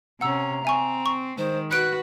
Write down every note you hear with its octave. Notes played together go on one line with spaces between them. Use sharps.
C3 C#4 F#5 A#5 E6
C4 E5 G#5 C#6
C#6
D#3 G#3 C5
F#4 B4 F#6 C#7 D7